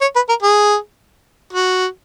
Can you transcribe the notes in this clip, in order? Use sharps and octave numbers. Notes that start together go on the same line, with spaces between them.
C#5
B4
A#4
G#4
F#4